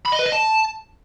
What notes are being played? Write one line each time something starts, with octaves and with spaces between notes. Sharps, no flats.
B5
D#5
B4
D#5
A5